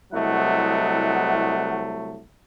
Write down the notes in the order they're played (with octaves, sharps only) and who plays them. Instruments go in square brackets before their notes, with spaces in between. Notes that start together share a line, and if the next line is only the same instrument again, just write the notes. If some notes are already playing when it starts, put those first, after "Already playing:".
[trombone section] C2 F#3 A3 [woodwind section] E4 D#5 F#5